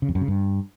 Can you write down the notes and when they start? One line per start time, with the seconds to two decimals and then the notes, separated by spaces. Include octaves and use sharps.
0.02 C#3
0.09 F2
0.15 F#2
0.21 C#3
0.28 G2